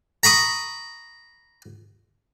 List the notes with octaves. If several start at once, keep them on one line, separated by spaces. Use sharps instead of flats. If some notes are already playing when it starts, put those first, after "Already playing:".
A#5 B5 C#6 D#6